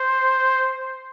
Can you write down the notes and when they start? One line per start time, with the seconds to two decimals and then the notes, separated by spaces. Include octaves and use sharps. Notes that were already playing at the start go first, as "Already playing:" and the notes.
Already playing: C5